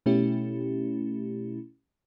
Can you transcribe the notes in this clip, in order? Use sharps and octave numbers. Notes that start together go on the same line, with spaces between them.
B2 A3 C#4 E4 G4